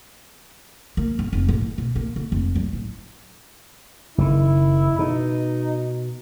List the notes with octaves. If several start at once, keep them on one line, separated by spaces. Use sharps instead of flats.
A#3
G1
F1
A1
E2
B2
A#3
D3
F1
F#3
A1
F#1 D#3 E4
B2 D#4